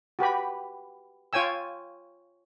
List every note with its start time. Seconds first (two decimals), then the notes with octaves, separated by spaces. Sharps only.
0.19 F#4 G4 B4 B5
1.33 F4 C#5 G5 G#5 E6